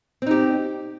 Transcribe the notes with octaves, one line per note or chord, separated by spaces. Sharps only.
C4 D#4 G4